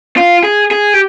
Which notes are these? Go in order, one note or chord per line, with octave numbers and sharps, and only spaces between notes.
F4
G#4
G#4
G4